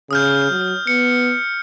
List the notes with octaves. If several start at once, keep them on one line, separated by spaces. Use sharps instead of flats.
C#3 D#6 F6 G6
F#3
B3 C#7